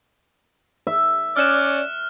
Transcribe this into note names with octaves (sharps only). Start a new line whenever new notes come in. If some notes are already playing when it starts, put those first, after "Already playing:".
E5
C#4 D5 F6 F#6 E7